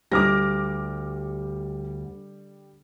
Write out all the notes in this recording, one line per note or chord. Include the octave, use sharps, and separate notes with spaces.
D2 G3 D6 F6 A#6